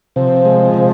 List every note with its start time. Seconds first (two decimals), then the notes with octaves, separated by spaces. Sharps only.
0.16 C3 F3
0.45 G#3
0.74 C3